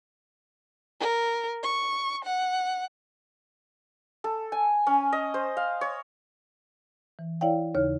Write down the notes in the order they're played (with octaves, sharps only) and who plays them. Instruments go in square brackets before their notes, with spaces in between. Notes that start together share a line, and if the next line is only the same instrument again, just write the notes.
[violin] A#4
C#6
F#5
[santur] A4
G#5
C#4
D#5
C5
F5
C#5
[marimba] E3
E4 C#5 D5 F5 G5
D#2 C#3 C#5 F6